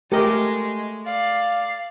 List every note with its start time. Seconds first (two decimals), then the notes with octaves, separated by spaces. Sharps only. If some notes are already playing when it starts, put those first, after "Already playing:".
0.12 G#3 A3 G4 A#4 D#5
1.06 D5 F5